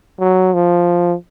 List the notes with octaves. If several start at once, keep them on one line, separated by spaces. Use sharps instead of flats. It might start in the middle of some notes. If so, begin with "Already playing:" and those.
F#3
F3